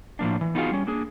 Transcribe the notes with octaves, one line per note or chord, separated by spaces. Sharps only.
A2 F3 A#3 D4
E3
B3 D#4 F4 F#4 G#4 F5
G3 C#4
A#3 D4 G#4